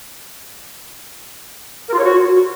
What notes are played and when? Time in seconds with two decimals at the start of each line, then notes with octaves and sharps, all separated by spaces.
1.88 A#4
1.93 F4
1.98 C#5
2.03 F#4